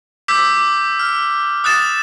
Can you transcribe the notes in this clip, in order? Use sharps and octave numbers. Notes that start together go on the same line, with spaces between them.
D6 E6 G6 B6
D6
F6
D#6 F#6 A6 E7